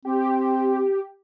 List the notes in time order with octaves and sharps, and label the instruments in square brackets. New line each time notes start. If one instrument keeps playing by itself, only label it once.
[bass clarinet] C4 [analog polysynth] G4